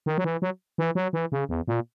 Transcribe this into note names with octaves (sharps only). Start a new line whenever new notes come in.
D#3
F#3
E3
F#3
E3
F#3
E3
C#3
E2
A#2